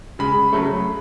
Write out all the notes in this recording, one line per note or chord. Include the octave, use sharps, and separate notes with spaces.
C#3 G#3 B5
C#3 F#3 A3